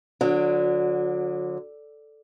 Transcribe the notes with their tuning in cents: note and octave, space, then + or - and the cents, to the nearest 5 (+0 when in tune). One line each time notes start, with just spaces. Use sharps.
D3 +0 F#3 -35